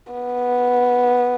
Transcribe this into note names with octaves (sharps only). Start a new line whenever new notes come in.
B3